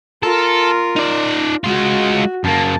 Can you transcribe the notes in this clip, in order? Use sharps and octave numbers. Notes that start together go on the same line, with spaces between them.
F4 A4 A#4
D#4 D5
G#3 F4 F#4
F#2 A#3 A5